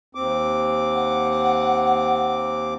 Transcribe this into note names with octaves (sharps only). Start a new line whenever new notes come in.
D#2 C4 D6
F#5